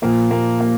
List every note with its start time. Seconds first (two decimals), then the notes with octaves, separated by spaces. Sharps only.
0.02 A#2 F3 A#3
0.31 A#3
0.60 A#3